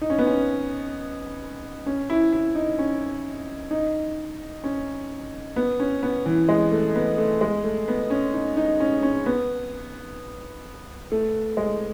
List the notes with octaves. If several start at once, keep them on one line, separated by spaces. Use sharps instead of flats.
D#4
C#4
B3
C#4
C#4
E4
E4
D#4
C#4
D#4
C#4
B3
C#4
B3
E3
G#3
A3
B3
A3
G#3
A3
B3
C#4
D#4
D#4
C#4
C#4
B3
A3
G#3